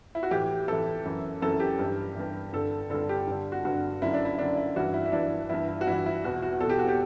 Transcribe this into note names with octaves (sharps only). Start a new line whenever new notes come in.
E4
F#4
A2 E3 G4
A2 E3 A4
F#2 E3
F#2 E3 A4
G4
G2
E3
G2 E3
G2 D3 A4
G2 D3 A4
G4
G2 D3
F#4
G2 D3 F#4
F#2 D3 E4
D4
E4
F#2 D3 D4
E4
G2 E3 F#4
E4
E4
G2 E3 D4
G2 E3 E4
E4
F#4
G2 E3 E4
E4
E2 B2 F#4
F#4
E2 B2 G4 A4
F#4
G4